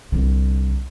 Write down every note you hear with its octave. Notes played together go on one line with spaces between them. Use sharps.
C2 D3